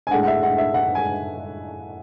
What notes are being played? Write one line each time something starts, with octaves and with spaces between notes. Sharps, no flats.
G#5
A2 G#3 D4 F#5
F#5
E5
F#5
E5
F#5
G#5